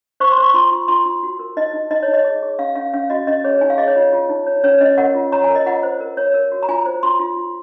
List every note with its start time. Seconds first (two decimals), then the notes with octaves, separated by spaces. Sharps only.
0.20 C5 C#6
0.32 C6
0.38 C5
0.43 C#6
0.54 F4 C6
0.71 F4
0.88 F4 C6
1.05 F4
1.23 F#4
1.39 A#4
1.57 D#4 D#5
1.73 D#4
1.90 D#4 D#5
2.03 C#5
2.08 D#4
2.13 D#5
2.24 G#4
2.43 G#4
2.59 C#4 F5
2.75 C#4 F5
2.94 C#4 F5
3.10 F#4 D#5
3.27 C#4 D#5
3.44 G#4 C#5
3.61 D#4 G#5
3.70 F5
3.78 G#4 D#5
3.87 C#5
3.96 F4
4.13 F4
4.29 D#4
4.47 C#5
4.64 C#4 C#5
4.81 C#4 D#5
4.98 A#4 F#5
5.15 F4
5.32 C#5 A#5
5.44 G#5
5.49 A#4
5.55 D#5
5.66 F4 F#5
5.83 C5
6.00 A#4
6.17 C#5
6.34 A#4
6.52 F#4
6.63 A#5
6.69 F4 G#5
6.86 C5
7.03 F4 C6
7.20 F4
7.37 F4